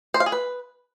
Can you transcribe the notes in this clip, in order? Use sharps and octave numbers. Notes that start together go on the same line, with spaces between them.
C5
F5
G#4
B4